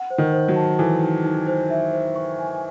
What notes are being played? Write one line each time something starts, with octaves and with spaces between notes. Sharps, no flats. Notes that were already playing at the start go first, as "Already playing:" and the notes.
Already playing: F#5
C5
D#3
C5
F#3
A5
E3 A4
D#4
D#4
C5
E5
C5
C#6
G#5